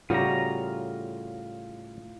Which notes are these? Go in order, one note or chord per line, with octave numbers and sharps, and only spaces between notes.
A2 C#3 G3 F4 F#4 A#5